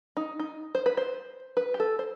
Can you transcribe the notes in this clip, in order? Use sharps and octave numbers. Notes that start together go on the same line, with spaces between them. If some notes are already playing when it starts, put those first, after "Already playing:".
D#4
D#4
C5
B4
C5
B4
G4
A4
C5